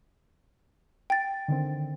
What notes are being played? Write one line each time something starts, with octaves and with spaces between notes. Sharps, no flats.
G5 A6
D3 D#3 C4